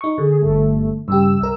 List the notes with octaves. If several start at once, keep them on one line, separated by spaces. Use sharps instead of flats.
D#4 C#6
D3 G#4
G1 A3
G2 C#3 G4 E6
C2 A#4